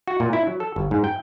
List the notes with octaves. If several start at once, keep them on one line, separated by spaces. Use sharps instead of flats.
F#4
A#2
E4
F#3
A4
G1
G#2
G5